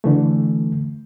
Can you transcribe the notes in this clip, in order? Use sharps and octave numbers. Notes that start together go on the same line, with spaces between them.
D3 E3 A3